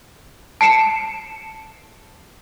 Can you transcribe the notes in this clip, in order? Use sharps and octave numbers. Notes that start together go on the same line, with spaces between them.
A5 C7 C#7 E7